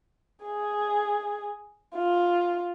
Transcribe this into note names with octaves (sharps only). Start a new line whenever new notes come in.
G#4
F4